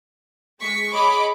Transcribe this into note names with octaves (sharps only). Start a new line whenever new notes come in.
G#3 C#6 B6
G#4 C#5 D#5 B5 D6